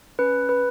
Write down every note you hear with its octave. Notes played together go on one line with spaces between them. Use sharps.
C#4 B4
B4